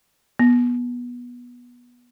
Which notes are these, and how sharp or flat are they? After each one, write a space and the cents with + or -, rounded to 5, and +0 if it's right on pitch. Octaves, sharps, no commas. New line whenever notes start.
B3 -20